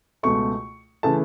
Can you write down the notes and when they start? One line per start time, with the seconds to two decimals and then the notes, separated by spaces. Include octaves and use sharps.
0.23 C#2 B2 A3 C#6
1.03 C#3 E3 A3 A5